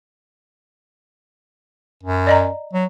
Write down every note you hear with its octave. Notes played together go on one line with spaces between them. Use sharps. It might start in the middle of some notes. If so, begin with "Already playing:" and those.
F#2
D5 D#5 A#5
F#3